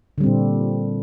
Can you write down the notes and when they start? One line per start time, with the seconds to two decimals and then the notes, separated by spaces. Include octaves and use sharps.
0.18 D3
0.20 G3
0.23 C4
0.26 A#2